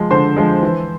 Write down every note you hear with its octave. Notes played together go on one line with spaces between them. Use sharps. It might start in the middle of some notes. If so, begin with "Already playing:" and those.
Already playing: F3 G#3
D3 C5 C6
F3 G#3
E3